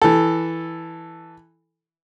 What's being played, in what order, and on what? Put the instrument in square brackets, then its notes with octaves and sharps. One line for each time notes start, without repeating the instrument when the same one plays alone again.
[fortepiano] E3 A4